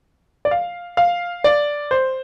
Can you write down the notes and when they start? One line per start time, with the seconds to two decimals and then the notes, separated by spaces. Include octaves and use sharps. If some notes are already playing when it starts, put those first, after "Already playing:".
0.45 D5
0.51 F5
0.97 F5
1.44 D5
1.91 C5